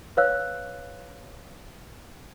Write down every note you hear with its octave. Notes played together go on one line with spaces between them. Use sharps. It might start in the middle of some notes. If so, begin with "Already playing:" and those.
B4 C#5 F5 E6 F#6